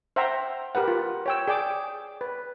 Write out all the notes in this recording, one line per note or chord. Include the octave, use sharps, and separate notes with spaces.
C5 E5 F#5 G5 A#5
G4 A#4 B4 F#5
F4
C#5 G5 E6
G#4 D5 G5 D6
B4